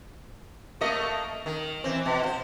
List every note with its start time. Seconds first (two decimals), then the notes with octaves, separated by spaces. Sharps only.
0.81 A3 A#3 D#5
1.46 D#3
1.84 E3 C4
2.06 B2
2.23 F4 C5